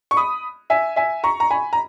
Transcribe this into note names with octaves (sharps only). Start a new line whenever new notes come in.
C#6
B5 D#6
E5 G#5
E5 G#5
A#5 C#6
A#5
G#5 B5
A#5